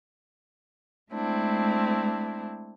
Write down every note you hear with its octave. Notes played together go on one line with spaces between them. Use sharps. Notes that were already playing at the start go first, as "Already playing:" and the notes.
G#3 A3 C4 D4 E4